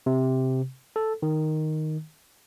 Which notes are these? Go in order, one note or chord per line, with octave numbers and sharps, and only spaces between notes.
C3
A4
D#3